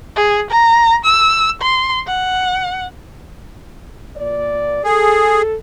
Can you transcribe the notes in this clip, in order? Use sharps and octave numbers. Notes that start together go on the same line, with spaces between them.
G#4
A#5
E6
C6
F#5
A#2 D5
G#4 A4